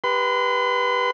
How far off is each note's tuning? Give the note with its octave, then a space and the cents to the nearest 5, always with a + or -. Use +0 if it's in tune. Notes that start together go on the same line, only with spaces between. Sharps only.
G4 +5 B4 -15 C6 -40